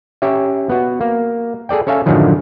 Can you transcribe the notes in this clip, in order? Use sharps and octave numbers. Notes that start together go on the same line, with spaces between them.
C#4 G4 C#5 E5
B3 F#4
A#3
G#4 A4 D5 G5
C#4 A4 C#5 E5 F5 G#5
F#2 A2 D3 D#3 F3 F#3